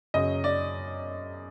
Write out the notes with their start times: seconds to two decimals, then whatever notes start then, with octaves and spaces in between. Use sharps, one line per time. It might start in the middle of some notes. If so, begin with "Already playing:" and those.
0.14 F#2 C#3 F#3 D#5
0.44 D5